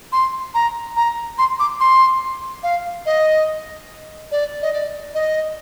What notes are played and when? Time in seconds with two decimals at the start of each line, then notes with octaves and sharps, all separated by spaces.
0.12 C6
0.54 A#5
0.96 A#5
1.38 C6
1.60 D6
1.80 C6
2.63 F5
3.06 D#5
4.32 D5
4.62 D#5
4.73 D5
5.14 D#5